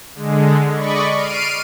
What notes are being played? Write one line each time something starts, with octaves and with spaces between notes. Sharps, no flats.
D3 G#3
D5 D#5 B5 C#6
F6 C7 D7 D#7